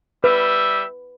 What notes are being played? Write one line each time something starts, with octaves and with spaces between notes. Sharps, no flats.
G3 B4 E5